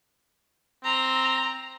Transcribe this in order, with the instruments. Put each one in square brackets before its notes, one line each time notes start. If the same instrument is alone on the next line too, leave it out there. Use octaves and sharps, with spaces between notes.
[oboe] C4 [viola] A#5